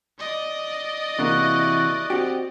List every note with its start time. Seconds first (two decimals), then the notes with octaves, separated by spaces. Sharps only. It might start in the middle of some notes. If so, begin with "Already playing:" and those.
0.19 D5 D#5
1.19 C3 E3 A#3 E4 F#4
2.10 C4 F#4 G4